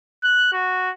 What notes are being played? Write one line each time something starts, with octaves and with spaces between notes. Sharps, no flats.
F#6
F#4